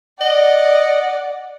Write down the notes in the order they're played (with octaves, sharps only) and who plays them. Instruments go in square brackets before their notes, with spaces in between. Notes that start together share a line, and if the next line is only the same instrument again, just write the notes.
[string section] D5 [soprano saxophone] D#5 [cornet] F#5